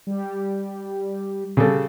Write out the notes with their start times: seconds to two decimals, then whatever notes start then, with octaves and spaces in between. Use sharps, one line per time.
0.07 G3 G4
1.57 C#3 G3 A4